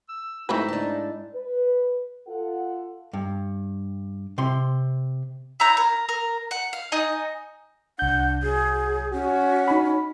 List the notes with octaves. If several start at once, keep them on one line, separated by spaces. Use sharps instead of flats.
E6
G#2 A3 C4 D#4 E4 B4
D4 A5
B4
F4 A4 F#5
G2
C3 C6
E4 C#5 A#5 G6
A#4
A#4
F#5
F5
D#4 D#5 G#5
C2 D4 F#5 G6
F#3 G#4
C#4 F#4
D#4 B5